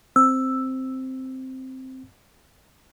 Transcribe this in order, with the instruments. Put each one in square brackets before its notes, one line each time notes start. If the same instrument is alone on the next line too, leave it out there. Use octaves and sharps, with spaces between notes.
[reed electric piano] C4 [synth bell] E6